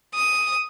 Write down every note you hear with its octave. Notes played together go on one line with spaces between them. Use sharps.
D#6